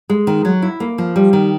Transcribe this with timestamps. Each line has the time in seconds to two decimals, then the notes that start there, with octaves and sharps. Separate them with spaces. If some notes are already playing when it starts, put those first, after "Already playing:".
0.10 G#3
0.27 D#3
0.45 F#3
0.62 E4
0.80 A#3
0.98 F3
1.16 G3
1.33 D#3